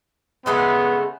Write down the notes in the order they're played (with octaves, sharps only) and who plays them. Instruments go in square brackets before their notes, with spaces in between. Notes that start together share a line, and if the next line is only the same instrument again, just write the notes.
[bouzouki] C#3 G#3 A3 [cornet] B3